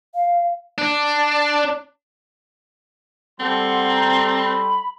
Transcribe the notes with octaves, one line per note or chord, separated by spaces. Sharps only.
F5
D4
G3 C4 A4 F#5 C6
A#5
B5